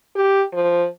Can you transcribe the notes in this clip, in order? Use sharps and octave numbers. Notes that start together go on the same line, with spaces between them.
G4
F3